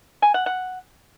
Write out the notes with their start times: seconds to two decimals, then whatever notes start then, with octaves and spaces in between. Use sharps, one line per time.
0.22 G#5
0.34 F#5
0.46 F#5